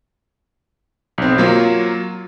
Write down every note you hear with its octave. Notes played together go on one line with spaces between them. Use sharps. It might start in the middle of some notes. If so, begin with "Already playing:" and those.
B1 C4
F#3 A#3 F4